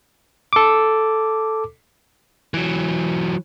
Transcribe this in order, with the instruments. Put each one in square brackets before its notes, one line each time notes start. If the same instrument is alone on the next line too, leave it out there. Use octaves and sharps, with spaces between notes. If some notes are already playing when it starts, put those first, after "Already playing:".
[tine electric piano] A4 D6
[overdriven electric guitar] E3 F#3